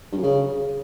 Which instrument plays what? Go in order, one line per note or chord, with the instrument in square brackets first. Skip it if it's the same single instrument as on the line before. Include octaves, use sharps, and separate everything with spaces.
[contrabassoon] G2
F#2
C#3